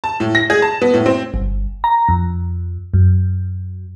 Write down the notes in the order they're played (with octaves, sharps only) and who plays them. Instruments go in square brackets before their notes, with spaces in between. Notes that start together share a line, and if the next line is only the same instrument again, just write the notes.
[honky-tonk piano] A5
A2
A#6
G#4
A5
B3
A2
C4
[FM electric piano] G1
A#5
F2
F#2